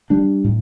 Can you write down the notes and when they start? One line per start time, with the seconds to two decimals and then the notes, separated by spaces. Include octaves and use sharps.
0.10 G3 D4
0.44 A2